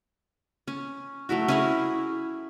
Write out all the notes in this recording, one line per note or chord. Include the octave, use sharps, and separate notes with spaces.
C#4
F#3 A3 E4 F#4
C#4 E4 G#4 A#4